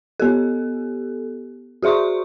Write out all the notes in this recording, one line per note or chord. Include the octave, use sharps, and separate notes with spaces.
B3 G4 A4
F#4 G#4 E5 C6 C#6